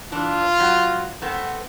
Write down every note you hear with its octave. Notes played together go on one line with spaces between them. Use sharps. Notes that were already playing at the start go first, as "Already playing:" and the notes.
E3 D4 F4
F#3
A3 B3 C4